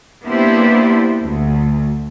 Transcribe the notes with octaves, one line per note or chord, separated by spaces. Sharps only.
A#3 B3 D4 E4 G4 C5
D2